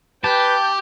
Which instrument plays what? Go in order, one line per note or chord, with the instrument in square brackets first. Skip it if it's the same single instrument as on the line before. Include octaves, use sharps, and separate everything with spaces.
[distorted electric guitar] G4 [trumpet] B4 [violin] G5 G6 [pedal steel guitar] A5